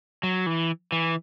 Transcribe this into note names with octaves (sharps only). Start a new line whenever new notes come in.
F#3
E3
E3